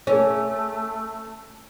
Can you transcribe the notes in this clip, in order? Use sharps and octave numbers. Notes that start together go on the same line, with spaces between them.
A3 C#4 G#4 A#4 C#5